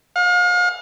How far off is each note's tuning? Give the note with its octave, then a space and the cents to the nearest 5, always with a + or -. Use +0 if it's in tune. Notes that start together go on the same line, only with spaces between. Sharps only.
F5 +40